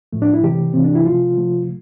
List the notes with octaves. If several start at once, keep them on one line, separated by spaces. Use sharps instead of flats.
A2 F3 A3
D4
E4
C3 E3 A3 G4
C3 E3 A3 C4
D4
E4
C3 F3 A3 F4
C3 F3 A3